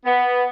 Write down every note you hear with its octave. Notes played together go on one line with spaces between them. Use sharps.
B3